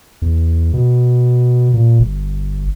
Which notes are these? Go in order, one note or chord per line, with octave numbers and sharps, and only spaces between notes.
E2
B2
A#2
G1